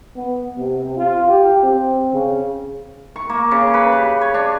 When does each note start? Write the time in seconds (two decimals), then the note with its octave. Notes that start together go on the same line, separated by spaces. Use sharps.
0.16 B3
0.57 C3
0.97 F4
1.29 G4
1.63 C4
2.13 C#3
3.16 C#6
3.29 A#3
3.51 C#3
3.74 B4
3.93 G4
4.21 C#5
4.34 D4